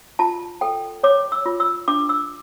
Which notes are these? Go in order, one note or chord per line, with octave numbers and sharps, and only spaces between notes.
F4 A5
A4 G5
C#5 D6
E6
F4
E6
D4 D6
E6